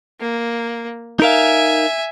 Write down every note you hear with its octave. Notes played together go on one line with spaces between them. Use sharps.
A#3
D#4 A#4 E5 F5 G#5